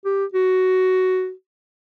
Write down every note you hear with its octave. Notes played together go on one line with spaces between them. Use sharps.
G4
F#4